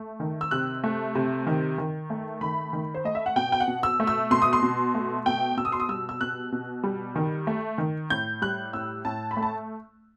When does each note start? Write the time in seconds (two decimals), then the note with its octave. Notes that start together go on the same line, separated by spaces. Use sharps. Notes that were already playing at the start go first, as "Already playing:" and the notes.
Already playing: A3
0.20 D#3
0.41 E6
0.51 C3 F#6
0.84 A3
1.15 C3
1.47 D#3
1.78 D#3
2.10 A3
2.41 D#3 B5
2.73 D#3
2.94 C5
3.05 A3 D#5
3.15 E5
3.26 F#5
3.36 B2 G5
3.52 G5
3.60 F#5
3.68 B2
3.83 E6
4.00 A3
4.07 E6
4.31 B2 C6
4.42 D#6
4.53 C6
4.62 B2
4.95 A3
5.26 B2 G5
5.57 B2 E6
5.65 D#6
5.72 C6
5.80 D#6
5.89 G3 E6
6.09 E6
6.21 B2 F#6
6.52 B2
6.83 G3
7.16 D#3
7.47 A3
7.78 D#3
8.10 A2 G6
8.42 G3 F#6
8.73 A2 E6
9.05 A2 A5
9.31 B5
9.37 A3
9.43 A5